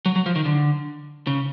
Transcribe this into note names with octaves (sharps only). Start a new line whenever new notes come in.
F#3
F#3
F3
D#3
D3
C#3